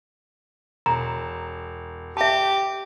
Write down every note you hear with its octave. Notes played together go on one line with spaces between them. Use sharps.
E1 A#5
G4 E5 A5